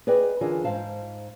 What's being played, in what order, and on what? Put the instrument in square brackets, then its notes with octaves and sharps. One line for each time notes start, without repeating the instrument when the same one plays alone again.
[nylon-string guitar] G#4 B4 D5 D#5 G5
D3 E3 F4 G#4 A#4 D5
G#2 C3 C5 F5 A5